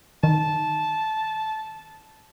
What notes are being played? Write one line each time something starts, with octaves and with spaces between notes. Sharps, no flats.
D#3 A5